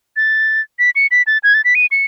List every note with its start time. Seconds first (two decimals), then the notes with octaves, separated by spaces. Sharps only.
0.17 A6
0.79 B6
0.96 C#7
1.11 B6
1.27 A6
1.43 G#6
1.54 A6
1.65 B6
1.75 D#7
1.91 C#7